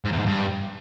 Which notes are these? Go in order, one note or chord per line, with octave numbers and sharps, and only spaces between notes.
G#2
E2
G#2
G2